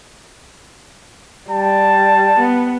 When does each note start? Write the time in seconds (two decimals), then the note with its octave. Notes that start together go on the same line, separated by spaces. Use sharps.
1.51 G3 A5
2.40 B3